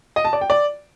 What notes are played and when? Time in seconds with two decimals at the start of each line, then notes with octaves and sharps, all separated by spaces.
0.16 D#5
0.25 A5
0.33 D5
0.41 G5
0.50 D5